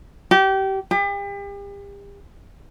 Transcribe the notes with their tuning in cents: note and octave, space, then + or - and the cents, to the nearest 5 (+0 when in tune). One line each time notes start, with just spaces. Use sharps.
G4 -25
G4 +40